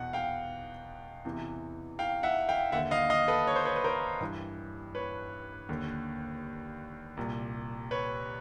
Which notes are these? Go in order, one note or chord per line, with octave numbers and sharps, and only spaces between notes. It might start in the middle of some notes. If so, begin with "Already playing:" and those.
Already playing: E2 B2 F#5
F5 G5
E2 C3 E3
F5 G5
E5 F#5
F5 G5
D#2 D3 E5 F#5
D#5 F5
D#5 F5
A4 B4
C#5
C5
B4 C#5
B4
A#4 C5
G2 E3
B4 C#5
D#2 D3
C2 A#2
B4 C#5